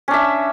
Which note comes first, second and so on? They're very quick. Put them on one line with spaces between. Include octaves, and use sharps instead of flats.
C#4 D4 E5